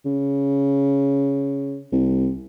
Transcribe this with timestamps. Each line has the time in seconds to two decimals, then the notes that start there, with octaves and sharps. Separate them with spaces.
0.05 C#3
1.92 C2